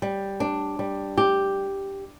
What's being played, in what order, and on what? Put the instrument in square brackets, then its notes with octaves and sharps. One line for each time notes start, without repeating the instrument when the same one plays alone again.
[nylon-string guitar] G3
D4
G3
G4